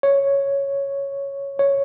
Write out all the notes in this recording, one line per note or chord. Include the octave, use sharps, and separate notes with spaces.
C#5
C#5